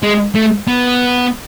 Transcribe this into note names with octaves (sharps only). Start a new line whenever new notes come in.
G#3
A3
B3